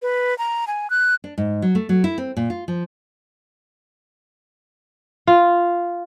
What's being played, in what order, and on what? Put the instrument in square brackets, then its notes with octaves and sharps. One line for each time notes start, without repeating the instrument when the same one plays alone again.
[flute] B4
A#5
G#5
F#6
[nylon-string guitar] D4
G#2
F#3
A3
F#3
E4
C4
A#2
F4
F3
[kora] F4